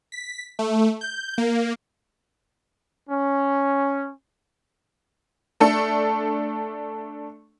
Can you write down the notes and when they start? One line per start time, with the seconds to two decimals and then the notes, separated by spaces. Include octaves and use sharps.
0.12 B6
0.59 A3
1.01 G6
1.38 A#3
3.10 C#4
5.60 A3 D4 A4